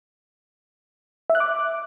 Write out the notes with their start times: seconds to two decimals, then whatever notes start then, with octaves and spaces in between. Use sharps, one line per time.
1.30 E5
1.35 F#6
1.40 D6